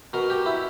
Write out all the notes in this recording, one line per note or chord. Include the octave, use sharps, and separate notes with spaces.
B2 A#4
G4
E4